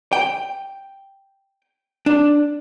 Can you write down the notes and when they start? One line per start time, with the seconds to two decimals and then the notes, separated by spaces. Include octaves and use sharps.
0.13 G5
2.06 D4